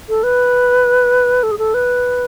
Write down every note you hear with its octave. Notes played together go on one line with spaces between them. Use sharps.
A4
B4
A4
G#4
A4
B4